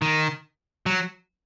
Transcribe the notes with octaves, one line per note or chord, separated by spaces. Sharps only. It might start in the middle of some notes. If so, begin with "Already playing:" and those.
D#3
F#3